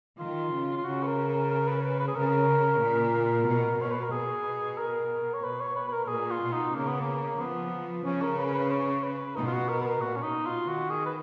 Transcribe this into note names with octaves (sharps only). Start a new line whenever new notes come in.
D#3 F4
C#3
F4
C#3 F#4
B4
A#4
A#4
A#4
B4
B4
B4
G#4
C#3 A#4
A#2
B2
B2 C#5
B4
A#4
B2 G#4
A#4
C#5
B2 B4
C#5
B4
B4
A#4
A#4
A#2 G#4
F4
B2
D#4
C#3 A#3
B3
A#3
F3 B3
C#3 C#4
A#4
B4
B4
C#5
B4
B2 D#4
F4
F#4
A#4
B4
A#4
A#2 F#4
C#4
D#4
B2
F4
D#3 F#4
G#4
B4